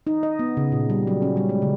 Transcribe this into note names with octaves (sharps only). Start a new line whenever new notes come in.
D#4
D#5
B3
C#3
A#2
G3
F#3
C#4
G3
G#3
C#3